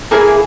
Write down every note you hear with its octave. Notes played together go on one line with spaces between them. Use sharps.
A#3 E4 G#4 G#5